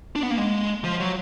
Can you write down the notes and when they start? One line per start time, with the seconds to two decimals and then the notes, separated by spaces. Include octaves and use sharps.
0.16 D4
0.23 B3
0.31 A#3
0.38 G#3
0.84 F3
1.00 F#3